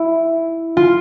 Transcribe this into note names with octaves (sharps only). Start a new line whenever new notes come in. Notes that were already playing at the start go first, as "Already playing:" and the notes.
Already playing: E4
F4